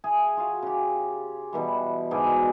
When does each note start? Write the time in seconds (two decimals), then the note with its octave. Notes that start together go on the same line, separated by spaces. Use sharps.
0.04 G#4 E5 G#5
0.37 F4 F#4 F5
0.63 C#3 G4
1.53 B2 E3 G3
2.11 G#2 B2 G#4 D5